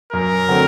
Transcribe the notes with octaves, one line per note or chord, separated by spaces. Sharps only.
F#2 A#4
D3 F#3 A3 C4